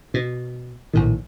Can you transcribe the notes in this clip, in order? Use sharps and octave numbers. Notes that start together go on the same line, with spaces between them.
B2
A#1 A2 D#3